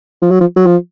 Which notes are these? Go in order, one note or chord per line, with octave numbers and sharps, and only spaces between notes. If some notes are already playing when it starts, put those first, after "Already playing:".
F3
F#3
F3
F#3
F3